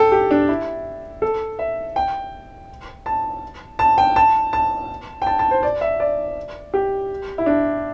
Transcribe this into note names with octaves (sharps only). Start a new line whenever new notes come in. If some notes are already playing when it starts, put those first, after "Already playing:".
Already playing: A4 G5
G4
D4
E4
A4
E5
G5
A5
A5
G5
A5
A5
G5
A5
A5
C5
D5
E5
D5
G4
E4
D4